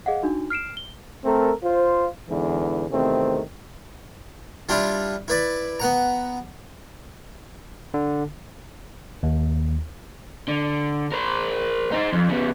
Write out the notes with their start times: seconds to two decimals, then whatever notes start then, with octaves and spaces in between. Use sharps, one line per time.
0.06 G#4 D#5 F5 F#5
0.23 D4 D#4 F#4
0.50 F6 C7 D7 E7
0.77 G7
1.24 A3 C4 A4 A#4
1.63 F4 C5
2.28 E2 G#2 D3 E3
2.89 E2 C3 D#3 A3 C4
4.69 G3 D4 E4 F4
5.28 E4 B4 D5
5.80 B3 F#5 A#5
7.94 D3
9.23 D#2
10.48 D3
11.12 A#4 C5
11.92 D#4 C5
12.13 F2
12.29 C#3 B3